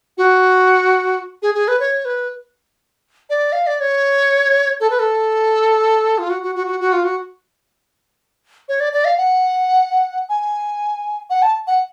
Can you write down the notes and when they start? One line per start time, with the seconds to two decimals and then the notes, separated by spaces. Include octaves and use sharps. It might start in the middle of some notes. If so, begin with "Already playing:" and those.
0.18 F#4
1.42 G#4
1.55 G#4
1.68 B4
1.80 C#5
2.05 B4
3.30 D5
3.52 F5
3.67 D5
3.81 C#5
4.80 A4
4.90 B4
4.99 A4
6.18 F4
6.30 F#4
6.42 F#4
6.55 F#4
6.67 F#4
6.80 F#4
6.93 F4
7.05 F#4
8.69 C#5
8.80 D5
8.93 D5
9.05 F5
9.18 F#5
10.29 G#5
11.30 F#5
11.42 A5
11.67 F#5